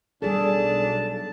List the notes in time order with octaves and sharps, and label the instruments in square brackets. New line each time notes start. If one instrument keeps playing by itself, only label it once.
[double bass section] B1 [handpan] G3 G#4 A4 [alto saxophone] D4 [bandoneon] A5